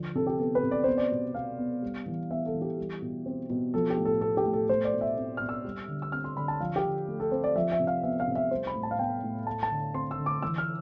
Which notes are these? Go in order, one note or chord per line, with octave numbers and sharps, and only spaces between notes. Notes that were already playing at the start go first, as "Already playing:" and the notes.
Already playing: D3 F3
C3 A4
G4
B3 A4
B4
C3
D5
B3 C5
D5
B2
B2 F5
B3
G3
E3
B3 E5
A4
E3
G4
G3
B2
C4
B2
F3 A4
G4
A2
A4
B3 A4
G4
A2
A4
A3 C5
D5
B2
E5
C4
B2 F6
E6
G3
D3
E6
C4 F6
C6
D3 B5
A5
F3 F5
G4
D3
A3
A4
C4 C5
D5
F3 E5
E5
C3
F5
B3 E5
F5
C3
E5
G3 C5
B5
A2
A5
F5
B3 G5
A2
A3 A5
A5
D3
C4 C6
E6
D3
D6
E3 E6
F6